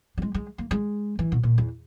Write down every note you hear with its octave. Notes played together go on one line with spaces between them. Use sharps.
G3
G#3
G#3
A#3
G#3
E3
B2
A#2
E2